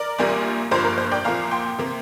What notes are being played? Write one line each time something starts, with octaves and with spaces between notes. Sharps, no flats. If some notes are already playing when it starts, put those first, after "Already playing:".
Already playing: A#4 D5
A#1 A#2 G3 A#3
G1 G2 F3 A#3 C5
A#4
C5
D5 G5
C2 A#2 F3 A#3 F5 A#5
G5 C6
C3 A#3